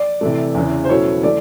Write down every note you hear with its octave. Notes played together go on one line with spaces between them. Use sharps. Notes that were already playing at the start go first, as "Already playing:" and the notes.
Already playing: D5
C3 E3 A3
E2 C#3 E3
C5
B2 F#3 A3 C#4 E4 C#5
E3 A3 D5